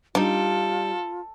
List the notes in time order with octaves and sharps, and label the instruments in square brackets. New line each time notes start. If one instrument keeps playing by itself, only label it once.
[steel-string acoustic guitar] G3 [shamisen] D4 D#4 [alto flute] F4 [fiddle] A4